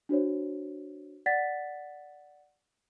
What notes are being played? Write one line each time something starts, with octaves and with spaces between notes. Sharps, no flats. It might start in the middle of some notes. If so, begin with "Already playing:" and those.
D4 F#4 C5 C#5
D5 F#5 A6 B6